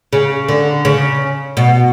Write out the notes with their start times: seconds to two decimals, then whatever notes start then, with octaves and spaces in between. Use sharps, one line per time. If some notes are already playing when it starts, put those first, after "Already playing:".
0.13 C#3
0.49 D3
0.85 C#3
1.57 B2